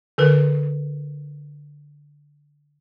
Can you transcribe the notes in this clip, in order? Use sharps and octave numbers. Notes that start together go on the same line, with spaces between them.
D3 A#4 B4